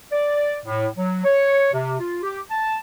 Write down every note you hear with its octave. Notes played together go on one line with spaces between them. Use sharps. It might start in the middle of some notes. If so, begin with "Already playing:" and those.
D5
A2
F#3
C#5
C3
F4
G4
A5